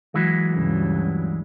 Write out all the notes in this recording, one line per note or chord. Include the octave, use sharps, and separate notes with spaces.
E3 F#3 G#3
D2 G2 C#3